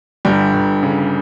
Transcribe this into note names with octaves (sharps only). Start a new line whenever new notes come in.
G1 G3
G1
C#3